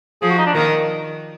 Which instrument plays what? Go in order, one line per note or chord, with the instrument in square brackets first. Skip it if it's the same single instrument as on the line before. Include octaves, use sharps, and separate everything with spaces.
[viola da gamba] F3 [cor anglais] G#4
[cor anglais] F#4
D#4
D4
[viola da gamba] D#3 [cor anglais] A#3